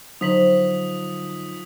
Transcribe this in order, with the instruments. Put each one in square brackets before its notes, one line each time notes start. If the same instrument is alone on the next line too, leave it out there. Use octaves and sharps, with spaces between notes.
[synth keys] D3 F#3 D#4 [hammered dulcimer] F3 [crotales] D#6 B6 F#7